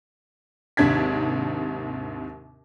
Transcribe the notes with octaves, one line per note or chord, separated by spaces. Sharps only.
D#2 G#2 C3 D4 G#6 B6